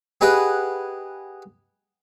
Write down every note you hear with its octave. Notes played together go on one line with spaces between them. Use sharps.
G4 G#4 B4 D#5 F#5 G5